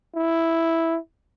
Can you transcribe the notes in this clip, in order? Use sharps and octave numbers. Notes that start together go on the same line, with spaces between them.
E4